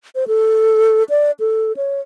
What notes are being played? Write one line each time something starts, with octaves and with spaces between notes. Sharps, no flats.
C5
A4
D5
A4
C#5